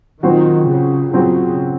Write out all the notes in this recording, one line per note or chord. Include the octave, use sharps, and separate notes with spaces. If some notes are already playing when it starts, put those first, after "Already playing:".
A#2 D#3 F#3 C4 F#4 C5
C#3
A#2 C#3 F#3 C4 F#4 C5